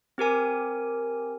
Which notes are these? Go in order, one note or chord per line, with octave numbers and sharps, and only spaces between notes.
C4 G4 A#4 G#5